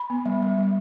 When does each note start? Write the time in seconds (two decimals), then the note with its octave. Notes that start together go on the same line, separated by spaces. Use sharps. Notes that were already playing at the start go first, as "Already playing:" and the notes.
Already playing: B5
0.10 B3
0.26 G3
0.42 G3
0.58 G3